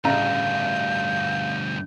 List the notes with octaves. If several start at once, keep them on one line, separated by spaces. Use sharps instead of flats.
A1 D2 G2 C#3 F5 A#5 G6